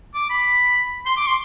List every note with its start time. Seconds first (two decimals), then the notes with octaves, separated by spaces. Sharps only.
0.15 D6
0.30 B5
1.06 C6
1.17 D6
1.27 C6